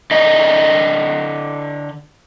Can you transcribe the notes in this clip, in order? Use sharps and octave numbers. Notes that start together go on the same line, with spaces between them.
D3 D5 D#5 G5 A#5